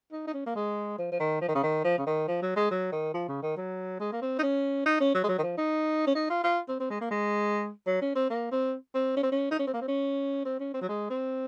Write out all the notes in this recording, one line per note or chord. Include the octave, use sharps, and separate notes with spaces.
D#4
D#4
C#4
A#3
G#3
F3
F3
D#3
F3
D#3
C#3
D#3
F3
C#3
D#3
F3
F#3
G#3
F#3
D#3
F3
C#3
D#3
F#3
G#3
A#3
C4
D#4
C#4
D#4
C#4
F#3
G#3
F#3
D#3
F3
D#4
C#4
D#4
F4
F4
C4
C4
G#3
A#3
G#3
F#3
C#4
C4
A#3
C4
C4
C#4
C4
C#4
D#4
C#4
C4
A#3
C4
C#4
C4
C#4
C4
F#3
G#3
C4